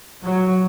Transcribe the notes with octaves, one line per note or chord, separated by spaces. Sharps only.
F#3